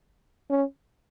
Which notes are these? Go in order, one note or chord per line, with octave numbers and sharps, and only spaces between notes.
C#4